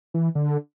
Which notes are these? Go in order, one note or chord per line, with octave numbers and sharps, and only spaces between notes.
E3
D3